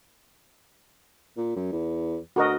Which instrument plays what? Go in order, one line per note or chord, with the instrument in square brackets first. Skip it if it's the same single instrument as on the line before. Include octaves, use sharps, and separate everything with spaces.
[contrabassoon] A#2
F#2
E2
[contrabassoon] D2 [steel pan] F#4 A#4 D#5